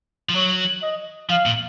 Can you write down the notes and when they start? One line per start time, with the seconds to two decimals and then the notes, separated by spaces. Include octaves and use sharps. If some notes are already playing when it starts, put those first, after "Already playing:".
0.29 F3
0.35 F#3 C#5
0.82 D#5
1.30 F3 F5
1.46 A#2